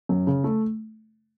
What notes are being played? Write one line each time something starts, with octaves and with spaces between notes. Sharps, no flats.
F#2
C#3
A3